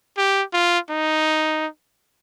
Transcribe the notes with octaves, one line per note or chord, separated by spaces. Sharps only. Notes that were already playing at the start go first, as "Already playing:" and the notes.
G4
F4
D#4